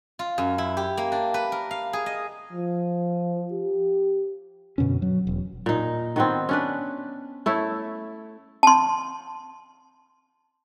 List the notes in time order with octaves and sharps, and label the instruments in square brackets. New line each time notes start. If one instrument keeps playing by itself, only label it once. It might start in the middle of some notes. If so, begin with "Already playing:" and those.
[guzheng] F4
F#2
E4
G4
A#3
D4
B4
A#4
F5
G#4
D#5
[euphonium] F3
G4
[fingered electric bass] F#2 B2 D3 C#4
F#3
E1
[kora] A#2 D#4
D#3 B3 C4
C#4 D4 B4
A3 E4 C#5
[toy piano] A5 C6